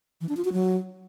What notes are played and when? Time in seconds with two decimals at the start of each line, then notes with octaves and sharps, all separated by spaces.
0.21 E3
0.29 D4
0.37 F4
0.45 F#4
0.53 F#3